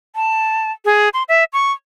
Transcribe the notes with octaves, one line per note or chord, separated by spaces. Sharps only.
A5
G#4
C6
E5
C#6